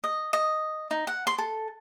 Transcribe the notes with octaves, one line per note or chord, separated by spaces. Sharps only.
D#5
D#5
D#4
F#5
C6
A4